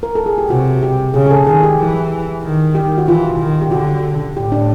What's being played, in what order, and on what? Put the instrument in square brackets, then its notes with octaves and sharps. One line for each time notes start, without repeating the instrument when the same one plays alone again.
[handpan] A#4
A4
G#4
G4
[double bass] C3 [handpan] F#4
[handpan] G4
[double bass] C#3 [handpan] G#4
[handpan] G#4
A4
[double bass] D#3 [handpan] G#4
[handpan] G4
[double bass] E3
D#3
[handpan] G4
F#4
[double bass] E3 [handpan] F4
[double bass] D#3
[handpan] G4
[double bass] D3 [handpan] F#4
[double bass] A2 [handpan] G4
[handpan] D4